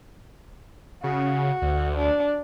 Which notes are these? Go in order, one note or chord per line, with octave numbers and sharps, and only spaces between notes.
C#3 F#4
D2
D4